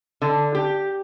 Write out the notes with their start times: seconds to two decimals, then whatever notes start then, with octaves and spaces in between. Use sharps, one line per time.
0.22 D3
0.55 G4